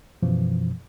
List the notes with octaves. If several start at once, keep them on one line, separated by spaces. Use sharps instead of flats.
F#2 B2 E3 F3